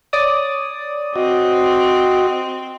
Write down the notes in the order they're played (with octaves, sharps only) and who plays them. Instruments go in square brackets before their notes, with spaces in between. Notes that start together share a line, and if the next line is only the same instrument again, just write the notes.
[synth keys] C#5 D5 D#6
[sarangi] C4 [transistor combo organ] F#4 D#5